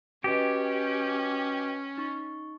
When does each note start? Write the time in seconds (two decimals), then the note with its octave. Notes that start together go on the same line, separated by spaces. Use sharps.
0.24 C#4 F#4 G4 B4 D#5
1.98 D#4 C#6